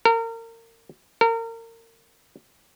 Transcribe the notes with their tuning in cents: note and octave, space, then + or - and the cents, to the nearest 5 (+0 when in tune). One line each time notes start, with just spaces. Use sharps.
A#4 -30
A#4 -30